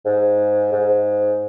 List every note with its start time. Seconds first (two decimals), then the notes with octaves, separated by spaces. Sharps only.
0.06 G#2
0.73 G#2